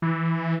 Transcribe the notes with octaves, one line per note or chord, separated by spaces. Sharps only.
E3